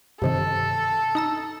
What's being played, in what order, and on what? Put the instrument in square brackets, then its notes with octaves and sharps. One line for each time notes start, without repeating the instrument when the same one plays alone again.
[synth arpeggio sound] G2 C3 D#3 [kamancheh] A4
[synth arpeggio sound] D#4 A#5 E6